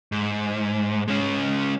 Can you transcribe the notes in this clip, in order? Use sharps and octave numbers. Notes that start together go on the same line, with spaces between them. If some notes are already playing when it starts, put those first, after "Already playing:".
G#2
G#3 C#4